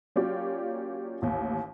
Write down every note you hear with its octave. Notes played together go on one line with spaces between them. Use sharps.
F#3 A#3 C#4 F4 G4 D5
A1 D#2